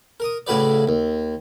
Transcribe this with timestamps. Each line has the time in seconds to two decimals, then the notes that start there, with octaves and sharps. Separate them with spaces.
0.20 A#4 D#6
0.47 A2 C#3 F#4 B4 D5
0.87 D#2